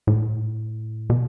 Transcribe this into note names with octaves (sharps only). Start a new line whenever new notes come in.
A2
B2